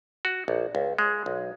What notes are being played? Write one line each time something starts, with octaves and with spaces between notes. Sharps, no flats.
F#4
A#1
C#2
G#3
B1